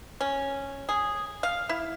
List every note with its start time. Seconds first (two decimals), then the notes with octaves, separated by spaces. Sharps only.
0.21 C#4
0.89 G#4
1.43 F5
1.69 E4